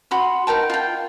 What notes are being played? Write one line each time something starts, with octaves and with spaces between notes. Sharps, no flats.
F#4 B5 C6
D#4 A#4 G5 A5
F4 G5